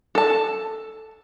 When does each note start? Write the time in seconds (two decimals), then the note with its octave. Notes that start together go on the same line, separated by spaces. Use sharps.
0.15 A4 A5